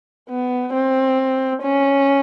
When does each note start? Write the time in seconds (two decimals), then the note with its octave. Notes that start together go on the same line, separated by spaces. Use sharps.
0.29 B3
0.73 C4
1.62 C#4